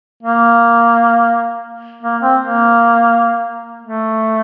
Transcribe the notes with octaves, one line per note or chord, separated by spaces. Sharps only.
A#3
A#3
C4
A#3
A3